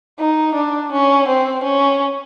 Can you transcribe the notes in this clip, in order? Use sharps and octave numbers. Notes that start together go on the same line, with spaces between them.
D#4
D4
C#4
C4
C#4